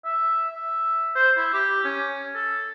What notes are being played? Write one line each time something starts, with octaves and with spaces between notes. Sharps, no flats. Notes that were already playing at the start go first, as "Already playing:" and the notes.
E5
E5
C5
E4
G4
C#4
A4